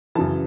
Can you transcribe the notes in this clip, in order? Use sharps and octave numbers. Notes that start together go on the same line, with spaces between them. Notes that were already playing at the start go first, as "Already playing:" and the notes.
F#2 C#3 E3 A5